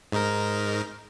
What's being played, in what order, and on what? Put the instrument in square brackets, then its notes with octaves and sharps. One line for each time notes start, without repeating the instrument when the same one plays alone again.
[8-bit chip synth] G#2 D#4 A#4